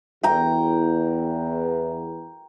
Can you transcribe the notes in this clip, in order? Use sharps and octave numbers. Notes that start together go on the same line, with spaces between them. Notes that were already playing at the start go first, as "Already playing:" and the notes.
E2 G5 A#5